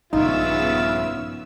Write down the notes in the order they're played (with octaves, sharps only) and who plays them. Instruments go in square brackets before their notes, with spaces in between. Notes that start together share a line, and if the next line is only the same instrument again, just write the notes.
[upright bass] A#1 G2 [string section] C#3 B3 E6 [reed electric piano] D#4 [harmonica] F4 E5